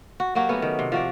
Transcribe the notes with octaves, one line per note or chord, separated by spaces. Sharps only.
F#4
F#3 A#3 F#4 G4
A3 B3 C#4
D#3
C3
F3 F#4 D5